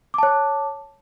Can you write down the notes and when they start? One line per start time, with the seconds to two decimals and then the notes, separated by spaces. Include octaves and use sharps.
0.14 D6
0.18 A5
0.23 C#5